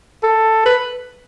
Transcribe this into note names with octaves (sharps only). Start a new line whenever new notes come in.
A4
B4